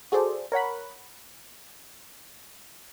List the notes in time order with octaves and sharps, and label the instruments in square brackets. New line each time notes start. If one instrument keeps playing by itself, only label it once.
[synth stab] F#4 G#4 A4 C5 D5
A#4 C#5 F#5 B5